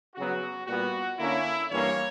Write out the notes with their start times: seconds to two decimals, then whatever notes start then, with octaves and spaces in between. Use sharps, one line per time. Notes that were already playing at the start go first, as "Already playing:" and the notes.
0.15 C#3 F#3 B3 F#4
0.66 A#2 G3 B3 F#4
1.18 D3 A#3 C#4 E4
1.70 G2 E3 A#3 C#4 C#5